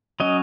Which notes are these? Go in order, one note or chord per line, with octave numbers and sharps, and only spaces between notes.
F#3 C#4 D#5